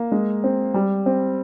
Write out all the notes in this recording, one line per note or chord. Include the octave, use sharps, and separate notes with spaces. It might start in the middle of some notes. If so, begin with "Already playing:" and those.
Already playing: A#3
G#3
C4
G3
C4